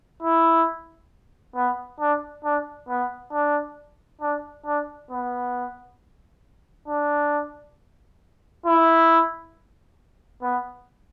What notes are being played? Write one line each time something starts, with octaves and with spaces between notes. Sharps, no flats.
E4
B3
D4
D4
B3
D4
D4
D4
B3
D4
E4
B3